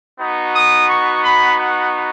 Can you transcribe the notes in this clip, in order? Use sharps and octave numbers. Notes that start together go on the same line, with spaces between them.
B3 D#4 F#4
D#6
C#6
B5
F#5